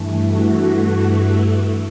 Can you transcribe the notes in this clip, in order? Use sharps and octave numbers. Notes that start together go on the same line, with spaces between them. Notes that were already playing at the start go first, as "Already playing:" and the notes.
Already playing: G2 E3 A3
F#4